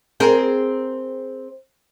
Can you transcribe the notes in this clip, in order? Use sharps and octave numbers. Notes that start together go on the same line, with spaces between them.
C4 G#4 A#4